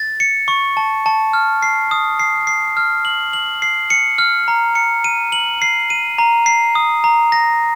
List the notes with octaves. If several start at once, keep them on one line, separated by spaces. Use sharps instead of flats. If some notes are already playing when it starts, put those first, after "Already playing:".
Already playing: A6
C#7
C#6
A5
A5
F6
C7
D#6
C7
C7
F6
F#7
F#7
C7
C#7
F6
A#5
C#7
D#7
F#7
C7
D#7
A#5
C7
D#6
A#5
A#6